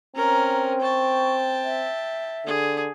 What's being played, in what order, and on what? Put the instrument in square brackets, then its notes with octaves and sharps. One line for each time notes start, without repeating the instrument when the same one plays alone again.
[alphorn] C4 [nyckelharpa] C#4 A#4 [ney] A#5
[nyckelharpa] G5 A5 [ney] C#6
[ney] E5
[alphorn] D3 [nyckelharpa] G#4